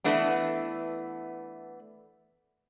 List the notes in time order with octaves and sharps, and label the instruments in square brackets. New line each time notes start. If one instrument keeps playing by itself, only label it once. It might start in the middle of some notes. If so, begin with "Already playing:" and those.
[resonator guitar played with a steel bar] E3 A3 B3 D4